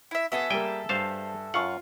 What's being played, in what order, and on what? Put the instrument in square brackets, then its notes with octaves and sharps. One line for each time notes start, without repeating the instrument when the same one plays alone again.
[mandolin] E4 E5
[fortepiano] B3 F#4 [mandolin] G#4 A4 E5
[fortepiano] G3 A#3 [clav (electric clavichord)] G5 G#5
[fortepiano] G2 [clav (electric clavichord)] C5 F5 A5
[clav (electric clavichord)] F#2 F#5 [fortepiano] F4 F5 C#6